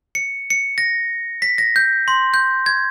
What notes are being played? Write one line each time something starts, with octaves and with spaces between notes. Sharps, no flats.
C#7
C#7
A#6
B6
A#6
G6
C6
G6
G#6